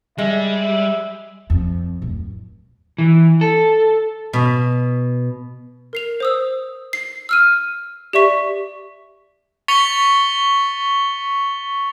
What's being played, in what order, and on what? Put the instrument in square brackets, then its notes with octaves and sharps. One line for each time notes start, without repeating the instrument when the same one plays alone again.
[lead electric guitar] G3 [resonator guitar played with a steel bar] G#3 [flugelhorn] E5
[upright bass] F2
D1
[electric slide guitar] E3
A4
[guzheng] B2
[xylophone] A#4 C7 F7
C5 D#6 E6
C7
E6 F6 D#7
G4 D5 E5 C#6 B6
[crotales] C#6 A6 B6 C#7 F7 G7